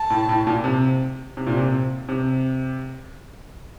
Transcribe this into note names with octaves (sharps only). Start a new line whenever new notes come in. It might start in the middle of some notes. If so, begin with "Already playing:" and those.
Already playing: A5
A2
A2
A#2
C3
C3
A#2
C3
C3